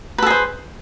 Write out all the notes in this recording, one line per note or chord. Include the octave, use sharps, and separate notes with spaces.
G#4 A4 B4 C5